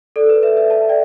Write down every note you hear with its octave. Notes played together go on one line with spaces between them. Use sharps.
A4 D5
B4
B4 E5
B4 E5
E5 A5
D5 G5